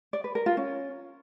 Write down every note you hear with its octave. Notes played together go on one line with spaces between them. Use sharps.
D5
B4
A#4
F4
C#4